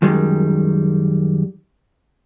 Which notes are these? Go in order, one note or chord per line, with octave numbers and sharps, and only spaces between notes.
F#2 D#3 G3 G#3